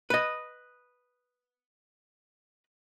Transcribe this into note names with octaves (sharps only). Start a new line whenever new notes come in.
B4 D#5